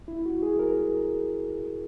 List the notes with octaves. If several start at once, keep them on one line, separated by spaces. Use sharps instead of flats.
E4
F#4
G#4
A#4